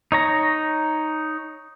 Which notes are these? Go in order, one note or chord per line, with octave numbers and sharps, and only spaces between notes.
D#4 C#5 A#5